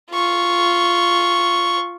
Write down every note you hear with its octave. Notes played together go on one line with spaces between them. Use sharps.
F4 C#6